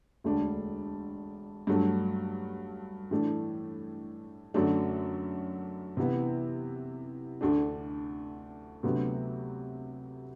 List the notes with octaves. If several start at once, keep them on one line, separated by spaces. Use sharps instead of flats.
E1 D2 D3 A3 D4
G2 F#3 A3
A2 E3 A3 D4
F#2 D3 F#3 A3 D4
C3 E3 B3 E4
D2 D3 A3 D4
D2 C3 F#3 B3